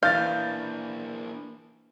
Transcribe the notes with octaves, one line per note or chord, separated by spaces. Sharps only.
E3 A#3 D4 F5 G6 A6